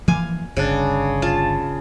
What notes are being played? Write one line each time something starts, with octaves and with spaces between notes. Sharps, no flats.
E3 F3 A#3 F5 G#5
G1 C#3 D4
F4 A5